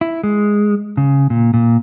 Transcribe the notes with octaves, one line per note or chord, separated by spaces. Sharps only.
E4
G#3
C#3
A#2
A#2